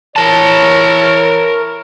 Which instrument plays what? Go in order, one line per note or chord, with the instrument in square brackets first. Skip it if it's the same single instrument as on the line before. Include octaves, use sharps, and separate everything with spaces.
[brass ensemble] E3 E4 C#5 [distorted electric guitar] A#4 A5